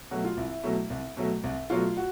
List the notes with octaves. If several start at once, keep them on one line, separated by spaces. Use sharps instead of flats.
B2 F#3 A3 F#4
F4
C2 E4
B2 F#3 A3
C2
B2 F#3 A3
C2
B2 F#3 A3 F4
F#4